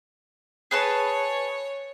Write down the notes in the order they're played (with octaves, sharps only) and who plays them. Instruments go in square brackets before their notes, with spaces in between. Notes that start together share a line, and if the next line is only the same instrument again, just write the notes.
[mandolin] G#4 B4 A5 [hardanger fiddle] C#5